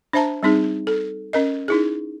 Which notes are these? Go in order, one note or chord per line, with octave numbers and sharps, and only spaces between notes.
D4 C5 E5 A5 A#5
G3 C4 D#4 G#4
A4
C#4 A#4 D#5
D#4 E4 G#4